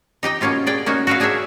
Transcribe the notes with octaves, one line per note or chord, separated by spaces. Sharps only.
D#4 G4 D#5 G5
B2 A#3 C#4 F4 G4
G#4 D5 G5
A#3 C#4 D#4 F#4
F#4 A#4 B4 E5 F5
D4 G#4 A#4 C#5 E5